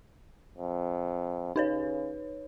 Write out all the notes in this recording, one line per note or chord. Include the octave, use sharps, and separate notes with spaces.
F2
C#3 D#4 B4 C#5